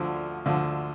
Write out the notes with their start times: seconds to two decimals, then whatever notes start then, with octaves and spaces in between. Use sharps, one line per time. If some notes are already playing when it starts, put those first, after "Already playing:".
Already playing: D2 D3 F3
0.46 D2 D3 F3